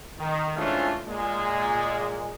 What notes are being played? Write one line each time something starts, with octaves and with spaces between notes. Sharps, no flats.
D#3
G#2 E3 A3 C#4 D4 F4
A#2 G#3